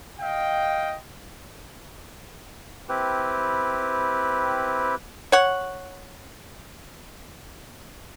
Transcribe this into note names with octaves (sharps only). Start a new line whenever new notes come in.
D#5 F5 G5
C4 E4 G4 B4
C#5 F#5